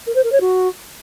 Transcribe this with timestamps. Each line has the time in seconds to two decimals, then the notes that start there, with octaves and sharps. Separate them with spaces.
0.07 A#4
0.15 C5
0.24 A#4
0.32 C#5
0.41 F#4